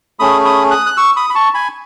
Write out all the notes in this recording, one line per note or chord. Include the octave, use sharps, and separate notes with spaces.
A3 C#4 G#4 B5 D#6
B5 D#6
D#6 F#6
F#6
C#6 E6
B5 D#6
B5
A5 C#6
G#5 B5